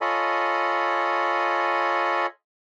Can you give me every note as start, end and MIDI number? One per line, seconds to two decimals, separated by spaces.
0.01 2.26 65
0.01 2.26 69
0.01 2.26 73
0.01 2.26 75
0.01 2.26 80
0.01 2.26 83